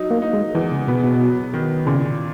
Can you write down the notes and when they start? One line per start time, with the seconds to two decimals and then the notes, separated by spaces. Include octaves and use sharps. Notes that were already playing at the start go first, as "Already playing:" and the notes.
Already playing: F#3 D#4
0.11 A#3
0.22 D#4
0.33 G#3
0.55 E2 E3
0.72 C#3
0.87 B2 B3
1.04 B2
1.21 F#3
1.54 D#3
1.86 A#2 C#3